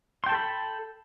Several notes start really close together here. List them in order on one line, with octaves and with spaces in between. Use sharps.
C6 G5 A5 A4 B5